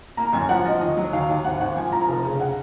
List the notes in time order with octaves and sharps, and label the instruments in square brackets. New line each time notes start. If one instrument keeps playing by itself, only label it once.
[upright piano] A#3 A#5
F#2 G#5
F3 F#5
F3 D#5
D#2 D#5
F#3
D#2 F5
D#2
G#1 F#5
G#1 F#5
F3 G#5
F3 A#5
F1
C#3
F#5